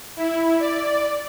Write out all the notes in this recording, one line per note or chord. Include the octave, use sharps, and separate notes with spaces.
E4
D5